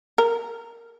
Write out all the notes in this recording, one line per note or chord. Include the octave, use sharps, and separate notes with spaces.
A#4